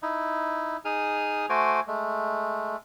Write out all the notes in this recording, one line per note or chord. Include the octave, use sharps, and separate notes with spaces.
D#4 E4
D#4 G#4 D#6 F6
A3 F#4 C5 G#5 D6
G#3 A3